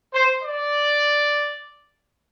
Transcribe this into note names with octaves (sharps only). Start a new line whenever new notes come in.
C5
D5